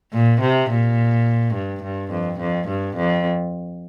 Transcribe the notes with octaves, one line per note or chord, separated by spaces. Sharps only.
A#2
C3
A#2
G2
G2
F2
F2
G2
F2